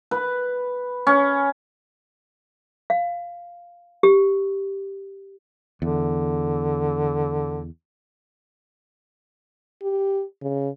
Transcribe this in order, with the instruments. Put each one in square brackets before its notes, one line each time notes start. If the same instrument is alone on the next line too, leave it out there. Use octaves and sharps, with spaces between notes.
[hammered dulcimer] B4
C#4
[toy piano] F5
G4
[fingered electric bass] E2 [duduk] D3
[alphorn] G4
C#3